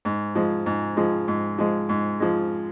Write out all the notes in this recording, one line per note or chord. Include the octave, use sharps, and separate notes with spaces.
G#2
F3 G#3
G#2
F3 G#3
G#2
F3 G#3
G#2
F3 G#3